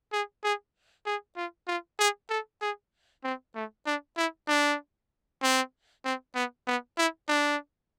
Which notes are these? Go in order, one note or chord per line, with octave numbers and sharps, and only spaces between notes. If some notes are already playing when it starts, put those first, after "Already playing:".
G#4
G#4
G#4
F4
F4
G#4
A4
G#4
C4
A3
D4
E4
D4
C4
C4
B3
B3
E4
D4